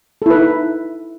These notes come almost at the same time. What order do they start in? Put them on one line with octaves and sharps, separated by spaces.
A4 E4 B4 D#4